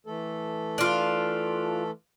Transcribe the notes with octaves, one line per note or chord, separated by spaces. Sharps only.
E3 A3 A4
D4 F4